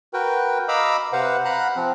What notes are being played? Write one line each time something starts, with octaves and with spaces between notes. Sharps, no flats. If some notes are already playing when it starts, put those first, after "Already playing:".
F#4 A#4 B4 G5
D#5 F5 A#5 B5 D6 E6
C3 B4 C5 F5 F#5
F5 F#5 A#5 B5 F#6
F3 C4